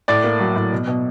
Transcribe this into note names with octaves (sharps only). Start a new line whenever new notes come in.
A2 D5
A#3
F#3
A2
B2
B2